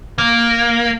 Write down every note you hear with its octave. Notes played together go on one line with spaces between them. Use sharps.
A#3